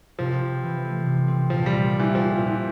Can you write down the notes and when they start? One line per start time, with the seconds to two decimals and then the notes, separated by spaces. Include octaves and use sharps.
0.19 C3 F3
0.41 C4
0.63 E3
0.84 A3
1.06 C3
1.28 C4
1.50 A#2 F3
1.66 G3
1.72 A#2
1.93 G3
2.00 E3
2.15 F3 A#3
2.32 F3
2.37 A#2
2.47 E3